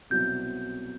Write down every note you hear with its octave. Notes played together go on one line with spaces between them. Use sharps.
C2 B2 F#3 C4 E4 G6